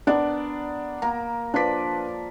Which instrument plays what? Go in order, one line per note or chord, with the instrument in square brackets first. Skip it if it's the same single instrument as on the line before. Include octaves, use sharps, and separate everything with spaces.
[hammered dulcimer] B3 A#4 [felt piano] D4 D5
[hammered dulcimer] A#3 [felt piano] A#5
[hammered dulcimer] F3 D5 [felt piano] D4 B4 B6